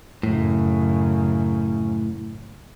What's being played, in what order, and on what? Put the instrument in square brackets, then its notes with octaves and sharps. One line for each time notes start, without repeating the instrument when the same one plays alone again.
[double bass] F#2 C#3 [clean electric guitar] A2